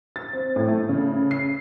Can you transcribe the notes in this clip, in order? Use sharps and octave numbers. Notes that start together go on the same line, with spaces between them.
A6
C4
A2
A3
C#3
C7